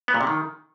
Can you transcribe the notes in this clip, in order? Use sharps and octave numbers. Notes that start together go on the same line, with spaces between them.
B3
A#2
C3
D#3